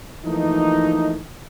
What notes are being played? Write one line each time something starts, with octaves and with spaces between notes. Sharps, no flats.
E3 F3 A3 A#3 D#4